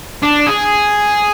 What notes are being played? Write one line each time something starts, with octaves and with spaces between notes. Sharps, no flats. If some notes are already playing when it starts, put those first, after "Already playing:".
D4
G#4